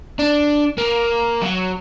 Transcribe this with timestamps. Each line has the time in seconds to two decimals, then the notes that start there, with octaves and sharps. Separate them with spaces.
0.19 D4
0.78 A#3
1.42 F#3